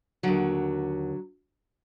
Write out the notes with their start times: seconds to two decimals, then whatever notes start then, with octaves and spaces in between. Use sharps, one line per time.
0.23 D#2 D3 F#3